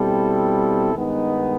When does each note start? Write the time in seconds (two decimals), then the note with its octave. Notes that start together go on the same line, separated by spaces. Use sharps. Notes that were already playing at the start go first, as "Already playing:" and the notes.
Already playing: B2 G3 C4 E4 A4
0.94 G2 D#3 G#3 B3 D#4